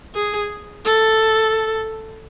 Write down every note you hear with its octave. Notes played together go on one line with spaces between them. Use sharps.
G#4
A4